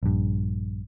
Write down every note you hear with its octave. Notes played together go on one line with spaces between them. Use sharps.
A#1 G2